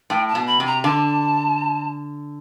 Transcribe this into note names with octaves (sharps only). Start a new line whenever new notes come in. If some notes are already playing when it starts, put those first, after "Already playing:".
A2 G5
A5
B2
B5
C3
A#5
D3 A5